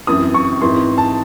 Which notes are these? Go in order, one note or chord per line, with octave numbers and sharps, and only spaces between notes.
F#2 E3 C4 D#6
C#6
G#2 E3 C4 C6
A5